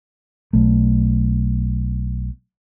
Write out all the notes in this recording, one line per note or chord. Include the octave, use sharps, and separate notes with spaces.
B1 A3